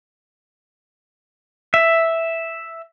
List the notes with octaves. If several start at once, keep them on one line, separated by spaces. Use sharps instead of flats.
E5